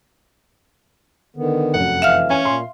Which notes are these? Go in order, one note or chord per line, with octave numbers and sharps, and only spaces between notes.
D3 D#3 B3
F1 F#2 F#5
E3 E5 F5 F6
C#4 G#5
A#2 C6